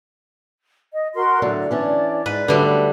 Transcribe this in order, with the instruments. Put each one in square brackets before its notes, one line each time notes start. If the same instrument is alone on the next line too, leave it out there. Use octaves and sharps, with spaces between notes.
[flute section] D#5
F#4 A#4 C6
[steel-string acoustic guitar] A2 D3 F#3 [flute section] D5
[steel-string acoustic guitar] E3 C#4 D4
[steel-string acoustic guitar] G#2 [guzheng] B4
[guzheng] D3 G3 [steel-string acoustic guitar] F#3 A3 B4